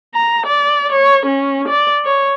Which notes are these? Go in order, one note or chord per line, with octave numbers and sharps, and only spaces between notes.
A#5
D5
C#5
C#4
D5
C#5